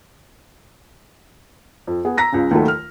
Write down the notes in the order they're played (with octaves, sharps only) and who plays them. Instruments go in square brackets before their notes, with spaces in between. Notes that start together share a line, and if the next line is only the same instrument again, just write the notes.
[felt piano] F2
B3 G#4
A#5 E6 A#6 B6
C#2 C#3
D#2 D#3 F#3 A3
F6